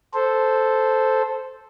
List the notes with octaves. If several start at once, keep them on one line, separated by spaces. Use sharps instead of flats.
A4 C5